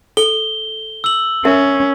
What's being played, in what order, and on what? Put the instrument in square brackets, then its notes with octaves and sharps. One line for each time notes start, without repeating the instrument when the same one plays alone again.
[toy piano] A4 [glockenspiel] G7
[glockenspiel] E6 F#7
[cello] C#4 [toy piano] A#4 E5